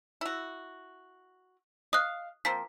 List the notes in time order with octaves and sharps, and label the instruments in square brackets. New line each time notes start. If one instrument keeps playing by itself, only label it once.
[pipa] E4 F#4
[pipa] D#5 F5 [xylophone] D#6 F#6
[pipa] F3 A#3 C4 [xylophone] B6